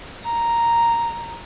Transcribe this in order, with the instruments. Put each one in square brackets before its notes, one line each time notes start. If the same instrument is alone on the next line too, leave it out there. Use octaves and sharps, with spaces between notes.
[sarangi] A#5